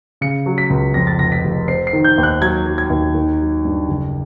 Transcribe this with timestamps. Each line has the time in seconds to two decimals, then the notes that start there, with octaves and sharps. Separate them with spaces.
0.21 C#3 C#7
0.46 F#3
0.58 B6
0.70 C#2
0.94 F2 A#6
1.07 A6
1.19 F1 A#6
1.32 B6
1.44 F1
1.68 C4 C7
1.87 C7
1.93 D#3
2.04 G6
2.18 D#2
2.23 F#6
2.41 F#3 G#6
2.66 F#3
2.78 G#6
2.90 D#2
3.15 D#3
3.40 F#3
3.65 G2
3.88 F#1